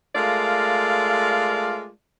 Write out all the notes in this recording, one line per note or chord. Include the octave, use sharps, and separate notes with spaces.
G#3 A3 F4 A#4 D5 F5